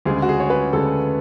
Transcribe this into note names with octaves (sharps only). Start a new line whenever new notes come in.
D2 C#3 G#3 G#4
F#4
G#4
C#5
B4
D2 C#3 G#3 A4